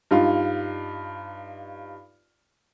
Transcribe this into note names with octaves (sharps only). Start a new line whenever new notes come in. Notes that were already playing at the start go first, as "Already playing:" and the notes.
G2 D#4 F4